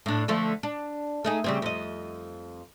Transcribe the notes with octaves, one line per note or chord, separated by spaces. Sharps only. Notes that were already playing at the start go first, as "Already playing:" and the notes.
A2 D4
D3 F3 A3
D4
A3 D#4 G#4
C#3 G3 C4
F2 D#5